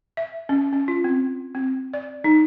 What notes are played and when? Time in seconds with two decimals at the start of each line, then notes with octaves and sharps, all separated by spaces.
0.17 E5
0.49 C#4
0.73 C#4
0.88 F4
1.04 C4
1.55 C4
1.94 D5
2.24 D#4